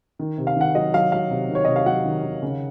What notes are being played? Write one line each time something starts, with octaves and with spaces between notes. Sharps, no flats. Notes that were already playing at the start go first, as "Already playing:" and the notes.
D#3
C3
F5
D#3 F#5
F#3 D#5
F#3 F5
F#3 F5
C3
D#3
C#5
C3 D#5
F5
F#3 F#5
D#3
D#3
C#3